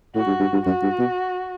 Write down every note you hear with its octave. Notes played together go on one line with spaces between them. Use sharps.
A2 F#4
G2
G2
G2
F#2 F#4
G2
B2